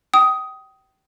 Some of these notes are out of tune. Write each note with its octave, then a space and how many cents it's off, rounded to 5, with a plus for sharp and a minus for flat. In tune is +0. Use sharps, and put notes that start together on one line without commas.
G5 -30 D#6 +10